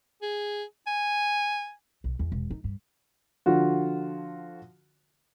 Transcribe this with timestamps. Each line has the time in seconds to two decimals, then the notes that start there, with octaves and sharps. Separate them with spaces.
0.22 G#4
0.87 G#5
2.04 B1
2.19 E2
2.32 E1
2.50 D#4
2.64 G2
3.46 D3 F3 F4 F#4